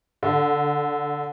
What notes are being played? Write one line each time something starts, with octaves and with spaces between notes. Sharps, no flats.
D3